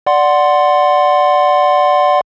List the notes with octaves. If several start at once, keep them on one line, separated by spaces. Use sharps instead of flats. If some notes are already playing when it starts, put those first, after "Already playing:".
D5 F#5 C6